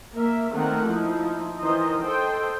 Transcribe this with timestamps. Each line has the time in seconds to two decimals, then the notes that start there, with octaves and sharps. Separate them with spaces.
0.14 A#3 A#4 E5
0.52 D#3 A3 A#3 C4 A#4 F#5
0.86 F3 D#4 E4
1.61 D#3 E3 C5 D#5 A#5
2.01 A4 C5 D#5 G5